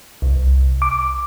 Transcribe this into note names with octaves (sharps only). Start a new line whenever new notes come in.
C2
D6